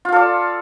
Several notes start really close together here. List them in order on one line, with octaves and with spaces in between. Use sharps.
F4 F5 A4 D5